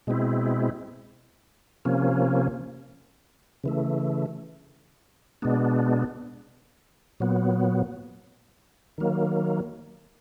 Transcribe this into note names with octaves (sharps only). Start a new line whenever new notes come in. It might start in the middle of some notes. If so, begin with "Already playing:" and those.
B2 G#3 C4 E4
C3 F3 A#3 C#4
C#3 E3 A3
B2 G#3 B3 D4
A#2 F#3 B3
D#3 F#3 A#3